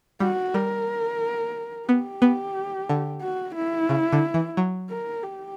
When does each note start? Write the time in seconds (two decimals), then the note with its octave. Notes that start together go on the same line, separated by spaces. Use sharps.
0.20 G3 F#4
0.54 G3 A#4
1.89 B3 G4
2.22 B3
2.89 D3
3.22 F#4
3.56 E4
3.89 C#3
4.12 D3
4.34 E3
4.57 F#3
4.90 A#4
5.23 G4